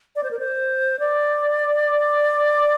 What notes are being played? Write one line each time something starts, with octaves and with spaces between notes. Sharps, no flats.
D5
C5
A#4
C5
D5